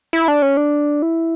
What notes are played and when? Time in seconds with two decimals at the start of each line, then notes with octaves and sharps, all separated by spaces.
0.13 E4
0.28 D4
0.42 C#4
0.57 D4
1.02 E4